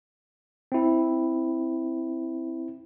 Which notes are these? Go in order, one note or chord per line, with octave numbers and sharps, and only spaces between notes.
C4 E4